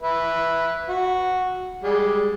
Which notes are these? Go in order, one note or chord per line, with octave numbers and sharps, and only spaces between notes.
B4 E5
F#4
G3 G#3